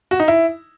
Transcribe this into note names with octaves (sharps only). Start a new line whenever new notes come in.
F#4
D#4
E4